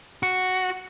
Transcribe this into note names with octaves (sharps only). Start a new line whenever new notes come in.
F#4